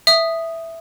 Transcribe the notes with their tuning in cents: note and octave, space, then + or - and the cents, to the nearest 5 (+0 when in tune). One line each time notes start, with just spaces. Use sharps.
E5 +0 D#6 -5